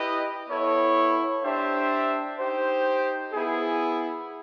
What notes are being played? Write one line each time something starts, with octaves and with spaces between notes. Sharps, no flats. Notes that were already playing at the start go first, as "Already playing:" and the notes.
Already playing: E4 G4 B4 D#5
B3 E4 A4 C#5
D4 G4 C5 E5 G5
D#4 G4 C5
B3 E4 G#4